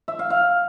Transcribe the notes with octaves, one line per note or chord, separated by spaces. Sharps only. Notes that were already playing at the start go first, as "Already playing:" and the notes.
E5
F5
F5